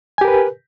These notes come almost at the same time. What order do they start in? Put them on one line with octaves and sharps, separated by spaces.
G#5 G4 A#4 B4